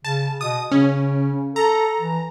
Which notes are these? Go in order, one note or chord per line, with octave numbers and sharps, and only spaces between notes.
C#3 A5
B2 D#6
C#3 C#4
A4 A#5
E3